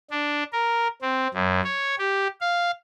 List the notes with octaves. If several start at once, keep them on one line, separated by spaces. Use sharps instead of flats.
D4
A#4
C4
F#2
C#5
G4
F5